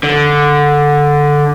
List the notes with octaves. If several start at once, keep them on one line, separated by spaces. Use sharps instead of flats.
D3